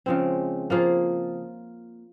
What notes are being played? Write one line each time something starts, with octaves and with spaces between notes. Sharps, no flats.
C#3 F3 G#3 C4
F3 A#3 F4 G#4